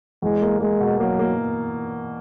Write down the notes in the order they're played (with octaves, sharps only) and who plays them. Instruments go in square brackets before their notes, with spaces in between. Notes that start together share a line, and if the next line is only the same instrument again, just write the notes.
[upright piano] E2 [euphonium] G#3
[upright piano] A#3
[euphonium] G#3 [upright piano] A#3
[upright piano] B2
[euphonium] F#3 [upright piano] A#3
[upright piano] A#3